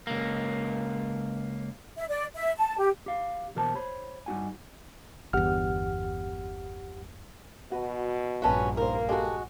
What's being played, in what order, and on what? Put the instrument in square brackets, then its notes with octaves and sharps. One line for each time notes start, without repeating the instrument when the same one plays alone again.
[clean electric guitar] C#2 A#3
[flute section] E5
D5
E5
A5
G4
[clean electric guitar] G4 F5
B2 E3 G4 A#4 C5 A5
C5 C#5 B5
G2 G3 D#4 F#4 F#5 G#5
[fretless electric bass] G1 E2 [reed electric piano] G4 F#5 F6
[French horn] B2 [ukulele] F#4 B4
[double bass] A#1 G2 [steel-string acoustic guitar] B3 C#4 F#4 [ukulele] E5 A5 B5
[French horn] A#3 [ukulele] D#4 C5 [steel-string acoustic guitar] A#4
[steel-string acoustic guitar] G#3 F#4 [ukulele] G4 A4 A5